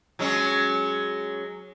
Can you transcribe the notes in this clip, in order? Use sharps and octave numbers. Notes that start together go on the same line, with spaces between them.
F#3 G#3 C#4